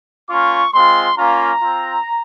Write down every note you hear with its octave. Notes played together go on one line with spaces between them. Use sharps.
A#3 C#4 F4 C#6
G#3 C4 F4 C6
A#3 C#4 F4 A#5
C4 F4